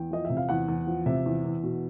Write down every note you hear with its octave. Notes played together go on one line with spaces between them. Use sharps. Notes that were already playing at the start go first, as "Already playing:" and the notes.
Already playing: E2 G5
F3 D#5
C3 E5
F5
E2 F#5
E2
F3
C3 E5
E2
E2
B2